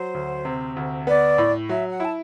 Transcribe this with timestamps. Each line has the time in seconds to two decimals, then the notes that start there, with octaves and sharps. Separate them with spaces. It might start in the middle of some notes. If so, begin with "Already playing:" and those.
Already playing: F#3 C5
0.14 D2
0.45 C3
0.76 D2
1.07 B3 D5
1.38 A2
1.69 F#3 E5
1.89 F#5
2.00 E4 A5